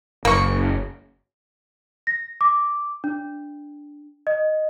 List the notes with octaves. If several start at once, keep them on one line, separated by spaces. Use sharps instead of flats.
F#1 A#3 C#6
A#6
D6
D4
D#5